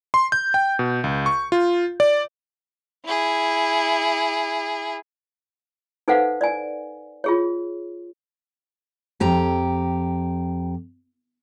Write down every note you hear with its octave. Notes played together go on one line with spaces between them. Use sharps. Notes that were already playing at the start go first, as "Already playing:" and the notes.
C6
G6
G5
B2
C#2
C#6
F4
D5
E4 G#4
D#4 A4 B4 C5 F5 F#5
D5 G#5
F4 G#4 C#5
F2 G4 A#5